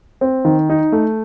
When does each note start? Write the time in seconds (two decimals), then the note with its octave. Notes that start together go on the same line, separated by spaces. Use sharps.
0.21 C4
0.45 D#3
0.69 D#4
0.92 A3